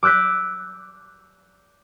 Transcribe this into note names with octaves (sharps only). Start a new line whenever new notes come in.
D6 E6 F#6 G6 B6